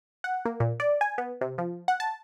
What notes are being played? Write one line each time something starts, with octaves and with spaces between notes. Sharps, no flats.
F#5
A#3
A#2
D5
G#5
B3
C3
F3
F#5
A5